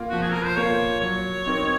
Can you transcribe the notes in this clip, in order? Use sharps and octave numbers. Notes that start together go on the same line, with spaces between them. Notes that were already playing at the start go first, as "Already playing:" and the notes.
Already playing: A#3 F4 A#4
F3 F#4
G#4
A#4
C5
A#3 F4 A#4 C#5
F#3 C#5
C4 D#4 A#4